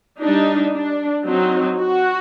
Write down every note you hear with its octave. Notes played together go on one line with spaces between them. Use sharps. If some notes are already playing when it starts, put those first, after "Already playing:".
G3 D4 D#4
D4
F#3 C4 D#4
F#4